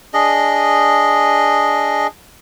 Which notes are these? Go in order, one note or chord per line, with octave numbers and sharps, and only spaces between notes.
D4 G#4 D#5